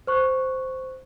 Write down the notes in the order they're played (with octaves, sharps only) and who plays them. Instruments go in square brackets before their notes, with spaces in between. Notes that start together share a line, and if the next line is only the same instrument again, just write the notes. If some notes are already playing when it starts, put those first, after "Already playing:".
[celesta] C5 C#6 F#6